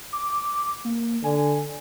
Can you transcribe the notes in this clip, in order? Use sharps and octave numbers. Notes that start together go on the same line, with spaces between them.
D6
A#3
D3 G#5